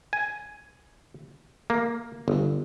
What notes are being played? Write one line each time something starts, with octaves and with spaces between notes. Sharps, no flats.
G#5
A#3
G1